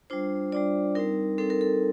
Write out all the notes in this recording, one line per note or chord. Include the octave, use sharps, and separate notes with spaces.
G3 D4 F4 C5
G3 D4 F4 D5
G3 C4 D#4 A#4
G3 C4 D#4 A4
A#4
A4